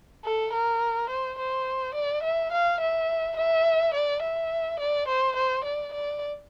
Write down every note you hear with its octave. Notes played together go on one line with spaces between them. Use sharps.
A4
A#4
C5
C5
D5
E5
F5
E5
E5
D5
E5
D5
C5
C5
D5
D5